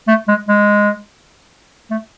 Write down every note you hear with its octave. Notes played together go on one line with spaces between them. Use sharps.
A3
G#3
G#3
A3